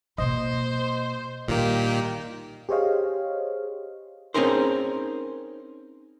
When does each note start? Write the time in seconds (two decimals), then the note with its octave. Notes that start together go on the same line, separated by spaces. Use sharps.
0.18 B2 A#3 C5 D#5
1.48 A#2 D#3 G3 A#3 G4
2.69 G4 G#4 C5 C#5 D#5 F5
4.34 C4 C#4 D#4 G#4 A#4 C5